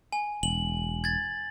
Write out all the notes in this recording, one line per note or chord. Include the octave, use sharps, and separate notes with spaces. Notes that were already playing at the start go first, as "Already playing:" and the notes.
G#5
E1 F#7
G#6 A6